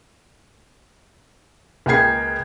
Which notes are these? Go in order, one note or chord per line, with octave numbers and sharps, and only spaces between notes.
C#2 A#3 G#4 G5 G#6 C7